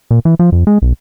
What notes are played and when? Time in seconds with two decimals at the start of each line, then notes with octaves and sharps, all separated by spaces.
0.11 A#2
0.25 E3
0.39 F3
0.52 F2
0.67 G#3
0.82 B1